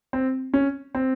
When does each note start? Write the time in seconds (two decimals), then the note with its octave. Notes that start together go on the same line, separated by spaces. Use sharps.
0.13 C4
0.54 C#4
0.95 C4